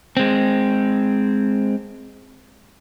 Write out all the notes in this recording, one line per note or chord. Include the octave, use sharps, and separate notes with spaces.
G#3 C4